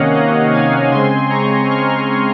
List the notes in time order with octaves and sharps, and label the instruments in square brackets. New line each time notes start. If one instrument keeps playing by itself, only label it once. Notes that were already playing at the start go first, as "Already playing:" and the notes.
Already playing: [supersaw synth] C3 D#3 A#3 C#4 C#5 D#5 F5 F#5
D#5 F#5
F5 G#5
C#3 G#3 C4 G#5 C6
A#5 C#6
C#6 F6